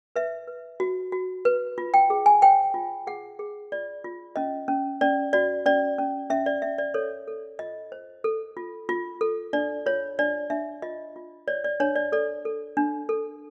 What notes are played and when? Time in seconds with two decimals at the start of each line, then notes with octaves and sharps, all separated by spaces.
0.16 B4 E5
0.48 B4
0.80 F#4
1.12 F#4
1.45 B4
1.78 F4
1.94 G5
2.10 G#4
2.26 G#5
2.42 C5 G5
2.74 F4
3.07 G#4 F#5
3.39 G#4
3.72 F4 D5
4.04 F4
4.36 C#4 D#5
4.68 C#4
5.01 C#4 D5
5.33 F#4 D5
5.66 C#4 D5
5.98 C#4
6.30 C#4 E5
6.46 D5
6.62 C#4 E5
6.78 D5
6.94 A4 C#5
7.28 A4
7.59 F4 D#5
7.92 C5
8.24 A4
8.57 F4
8.89 F4
9.21 A4
9.53 D4 D5
9.86 F4 C#5
10.19 D4 D5
10.50 D4 E5
10.82 F4 D#5
11.16 F4
11.48 C#5 D5
11.64 D5
11.80 D4 C#5
11.96 D5
12.12 A4 D5
12.45 A4
12.77 D4
13.09 A4